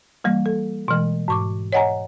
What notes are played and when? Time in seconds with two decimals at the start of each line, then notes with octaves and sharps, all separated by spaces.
0.24 E3 G3 A#3
0.46 A4
0.88 B2 E3 G#3
1.28 G#2 C#6 D6
1.73 C#5 D#5 F#5 G#5 A#5